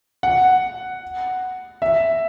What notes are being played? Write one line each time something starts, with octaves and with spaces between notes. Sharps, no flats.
F#5
E5